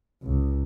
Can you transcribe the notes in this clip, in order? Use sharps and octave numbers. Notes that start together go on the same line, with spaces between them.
C#2